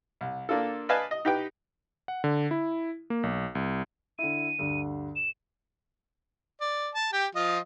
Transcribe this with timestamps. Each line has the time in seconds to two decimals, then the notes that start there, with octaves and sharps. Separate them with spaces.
0.21 C2
0.49 A#3 D4 F4 A4
0.89 B4 D5 D#5 F5 G#5 A5
1.11 D#5
1.25 D#4 G4 B4 G5
2.08 F#5
2.24 D3
2.51 E4
3.10 A#3
3.23 B1
3.55 C2
4.19 D3 E4 D#7
4.59 D2 G2 D3
5.16 E7
6.61 D5
6.94 A5
7.13 G4 G5
7.35 F3 F4 D#5